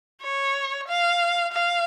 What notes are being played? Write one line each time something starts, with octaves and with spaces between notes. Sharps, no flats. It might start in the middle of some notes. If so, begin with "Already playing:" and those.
C#5
F5
F5